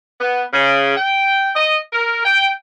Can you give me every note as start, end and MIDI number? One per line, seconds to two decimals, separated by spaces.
0.21 0.44 59
0.53 0.92 49
0.97 1.51 79
1.56 1.78 75
1.93 2.24 70
2.25 2.50 79